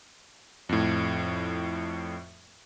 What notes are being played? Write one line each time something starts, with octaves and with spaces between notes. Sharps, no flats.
F2 A2